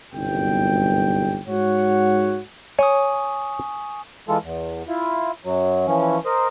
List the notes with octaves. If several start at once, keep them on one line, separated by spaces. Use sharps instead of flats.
G1 C2 F#2 B2 D#4 G5
G#2 F#4 C#5 F#5
C#5 G#5 C#6 D#6
E3 G#3 F4 A4
E2
E4 F4
F#2 F#3
E3 F3 C#4
A#4 C5 D#5